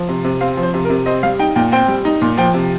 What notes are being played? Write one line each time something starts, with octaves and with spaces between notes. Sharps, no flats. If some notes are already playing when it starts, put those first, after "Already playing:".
Already playing: F3
C3
C3
C4 F5
F3
C5
C3
A#4
C3
C4 D#5
G3 F5
D#4 G5
A#2 G5
C4 G5
G3
D#4
A#2
F3 G5
C3